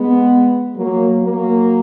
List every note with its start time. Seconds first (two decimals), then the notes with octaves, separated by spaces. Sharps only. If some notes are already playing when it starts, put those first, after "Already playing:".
Already playing: G#3 B3
0.76 F#3 A#3
1.22 F#3 A#3